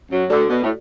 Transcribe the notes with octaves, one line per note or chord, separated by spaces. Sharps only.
F#2 F#3
D2 D3 F#4 A4 D5
B2
A2